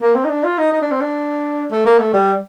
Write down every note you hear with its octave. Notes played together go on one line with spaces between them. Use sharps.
A#3
C4
D#4
D4
F4
D#4
D#4
D4
C4
D4
A3
A#3
A3
G3